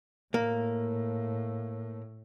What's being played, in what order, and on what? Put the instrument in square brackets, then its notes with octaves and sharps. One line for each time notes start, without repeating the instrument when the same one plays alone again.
[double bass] A2 [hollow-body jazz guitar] A#3